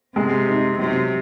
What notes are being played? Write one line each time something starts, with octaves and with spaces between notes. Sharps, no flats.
C3 G#3
C4 D#4
C3 F#3